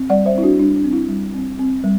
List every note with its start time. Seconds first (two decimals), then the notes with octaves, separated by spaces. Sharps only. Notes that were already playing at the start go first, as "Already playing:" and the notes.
Already playing: C4
0.10 G3 D5 F#5
0.26 C5 E5
0.34 C4 E4
0.43 D4 F#4
0.59 G3 D4
0.76 D4
0.85 C4
0.93 E4
1.09 G3
1.34 C4
1.59 C4
1.84 G3